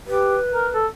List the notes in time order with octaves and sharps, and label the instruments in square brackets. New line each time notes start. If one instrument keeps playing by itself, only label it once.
[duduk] G4 [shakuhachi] B4
[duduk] A#4
A4